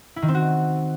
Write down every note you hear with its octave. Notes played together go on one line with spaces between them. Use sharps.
E4
D#3
C4
F#4